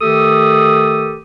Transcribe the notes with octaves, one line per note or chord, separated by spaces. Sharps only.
D#3 A3 G4 A4 D#6